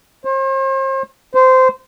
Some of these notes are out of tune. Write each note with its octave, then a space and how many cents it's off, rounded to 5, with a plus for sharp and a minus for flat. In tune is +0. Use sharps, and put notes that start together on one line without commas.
C5 +40
C5 -15